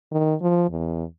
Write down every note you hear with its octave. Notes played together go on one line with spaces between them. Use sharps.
D#3
F3
E2